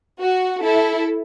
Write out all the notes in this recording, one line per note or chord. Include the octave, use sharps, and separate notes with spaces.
F#4
E4 A4